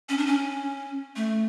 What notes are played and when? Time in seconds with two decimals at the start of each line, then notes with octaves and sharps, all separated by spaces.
0.09 C#4
0.18 D4
0.26 C#4
1.16 A3